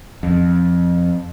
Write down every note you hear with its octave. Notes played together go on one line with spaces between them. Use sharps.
F2